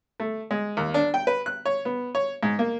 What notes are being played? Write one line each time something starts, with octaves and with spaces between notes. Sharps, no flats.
A3
G#3
D#2
D4
G5
B4
F#6
C#5
B3
C#5
G#2
A#3